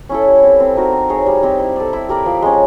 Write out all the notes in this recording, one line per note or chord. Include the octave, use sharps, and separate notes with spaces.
C#4 E4 A4
G3
C4 E4 G4
C4
D#4 F#4 A#4
C4
D#4 G#4 C#5
G3
C4 D#4 G4
E4
A4 D5
E4
G4 A#4 D5
F3
G#3 C#4